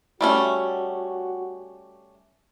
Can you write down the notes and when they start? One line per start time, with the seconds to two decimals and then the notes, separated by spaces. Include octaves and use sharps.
0.21 G3 A3 C#4 F#4